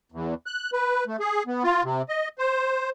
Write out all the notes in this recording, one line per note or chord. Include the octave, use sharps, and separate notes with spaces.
E2
F#6
B4
A3
G#4
B3
F4
C3
D#5
C5